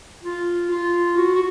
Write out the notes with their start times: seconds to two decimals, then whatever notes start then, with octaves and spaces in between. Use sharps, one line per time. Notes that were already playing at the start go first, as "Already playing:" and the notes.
0.24 F4
0.71 F4
1.17 F#4
1.34 F#4